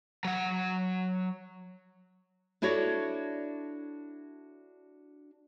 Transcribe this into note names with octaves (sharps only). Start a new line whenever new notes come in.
F#3 F#5
D4 E4 F#4 A4 C#5 D5